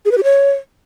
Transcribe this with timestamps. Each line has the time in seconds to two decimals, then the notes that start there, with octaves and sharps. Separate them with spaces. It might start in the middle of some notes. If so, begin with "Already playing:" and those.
0.05 G#4
0.11 B4
0.18 G4
0.24 C#5